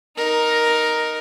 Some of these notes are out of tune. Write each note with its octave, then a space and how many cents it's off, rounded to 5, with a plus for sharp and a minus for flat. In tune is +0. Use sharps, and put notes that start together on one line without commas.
D#4 +0 A#4 +5